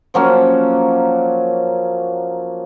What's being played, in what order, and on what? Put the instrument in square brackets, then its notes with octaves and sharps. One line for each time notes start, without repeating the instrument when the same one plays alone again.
[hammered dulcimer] F3 F#3 A#3 C#4